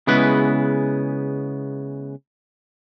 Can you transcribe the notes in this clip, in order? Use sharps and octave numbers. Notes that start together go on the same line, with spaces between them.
C#3 G#3 B3 E4 B4